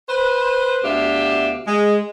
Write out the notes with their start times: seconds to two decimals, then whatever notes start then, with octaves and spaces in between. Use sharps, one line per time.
0.09 B4 C5
0.84 D2 B2 D4 G4 E5 F5
1.67 G#3